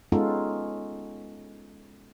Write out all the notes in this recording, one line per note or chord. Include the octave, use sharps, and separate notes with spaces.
G#3 B3 C#4 D#4 F4 A4